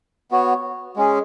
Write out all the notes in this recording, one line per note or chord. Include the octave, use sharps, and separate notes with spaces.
B3 F#4 C#5
G#3 C#4 G#4